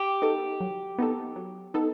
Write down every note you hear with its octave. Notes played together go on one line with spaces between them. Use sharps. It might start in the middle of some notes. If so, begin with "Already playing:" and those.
Already playing: G4
B3 D#4 A4
F#3
B3 D#4 A4
F#3
B3 D#4 A4